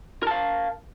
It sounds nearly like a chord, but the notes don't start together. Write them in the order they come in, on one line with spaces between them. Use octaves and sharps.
A#4 A5 F5